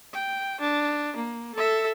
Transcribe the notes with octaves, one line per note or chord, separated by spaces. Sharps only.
G5
D4
A#3
A4 E5